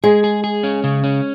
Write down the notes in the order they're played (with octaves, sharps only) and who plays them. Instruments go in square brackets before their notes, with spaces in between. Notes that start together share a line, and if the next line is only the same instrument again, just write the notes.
[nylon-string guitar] G#3 [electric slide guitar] G#4
[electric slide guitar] G#4
G#4
C#4
C#3
C#4